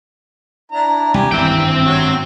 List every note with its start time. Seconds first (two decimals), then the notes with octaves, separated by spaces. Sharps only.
0.72 D4 E4 A#5
1.14 C2 G4 G#5 A#5
1.32 G#1 G2 E3 C4 E5 G5
1.85 F#3 F#4 C#5